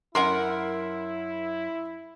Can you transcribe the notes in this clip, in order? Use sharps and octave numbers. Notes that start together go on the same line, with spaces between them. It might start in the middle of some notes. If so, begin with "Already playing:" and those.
F#2 E4 A#4 F#5 C6